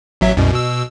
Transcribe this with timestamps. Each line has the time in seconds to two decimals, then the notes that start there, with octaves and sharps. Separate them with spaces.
0.21 A1 F#3 E5
0.37 C2 F#2 B2
0.53 B2 E6